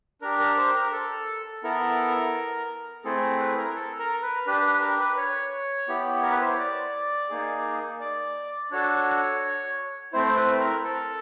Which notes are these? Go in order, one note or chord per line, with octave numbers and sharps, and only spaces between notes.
D4 G4 A#4
A#4
C5
A#4
A4
B3 E4 A4 A#4
A3 C4 E4 G#4 A4
B4
A#4
A4
A#4
B4
D4 G4 B4
B4
A#4
B4
C#5
B3 E4 G4
A#4
B4
C5
C#5
D5
A#3 D#4 G#4
D5
D4 F#4 A4 C#5
A3 C4 E4 C5
B4
A#4
A4